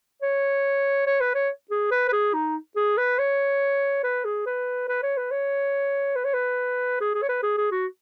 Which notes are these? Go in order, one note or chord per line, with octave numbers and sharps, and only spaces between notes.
C#5
C#5
B4
C#5
G#4
B4
B4
G#4
D#4
G#4
B4
C#5
B4
G#4
B4
B4
C#5
B4
C#5
B4
C#5
B4
G#4
G#4
C#5
B4
G#4
G#4
F#4